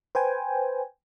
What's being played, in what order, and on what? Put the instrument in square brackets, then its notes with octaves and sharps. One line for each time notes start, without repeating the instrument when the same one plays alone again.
[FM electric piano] B4 C5 G5 G#5